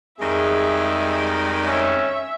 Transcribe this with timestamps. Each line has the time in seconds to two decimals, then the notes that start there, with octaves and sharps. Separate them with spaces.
0.20 F2 D#3 G3 G#3 G#4 E5
1.66 C#4 E5